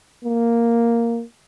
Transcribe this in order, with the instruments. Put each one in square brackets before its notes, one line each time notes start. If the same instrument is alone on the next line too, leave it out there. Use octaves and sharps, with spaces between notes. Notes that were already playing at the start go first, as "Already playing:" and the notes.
[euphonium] A#3